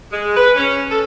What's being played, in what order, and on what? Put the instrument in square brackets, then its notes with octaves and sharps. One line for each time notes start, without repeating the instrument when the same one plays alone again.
[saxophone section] G#3
B4
C#4
A4